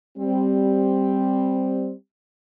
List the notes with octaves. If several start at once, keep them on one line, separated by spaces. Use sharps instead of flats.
G3 C4